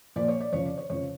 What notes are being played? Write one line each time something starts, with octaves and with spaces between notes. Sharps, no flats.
A#2 F3 A#3 D5
C#5
D5
F2 C#3 F3 C#5
D5
C#5
F2 C#3 F3 C#5